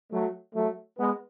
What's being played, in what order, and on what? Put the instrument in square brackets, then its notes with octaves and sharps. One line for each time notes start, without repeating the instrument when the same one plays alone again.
[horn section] F#3 A3
F#3 A3
G#3 B3